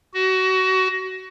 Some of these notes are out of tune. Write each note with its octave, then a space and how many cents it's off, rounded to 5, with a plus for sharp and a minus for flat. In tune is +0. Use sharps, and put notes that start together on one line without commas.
F#4 +25